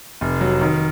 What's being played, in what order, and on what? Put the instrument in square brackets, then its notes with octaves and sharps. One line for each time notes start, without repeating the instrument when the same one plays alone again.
[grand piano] F1
F#3
D#3